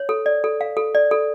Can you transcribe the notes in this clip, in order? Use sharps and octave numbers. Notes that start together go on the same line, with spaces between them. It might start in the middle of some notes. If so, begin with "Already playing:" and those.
Already playing: C#5
A4
D5
A4
F5
A4
D5
A4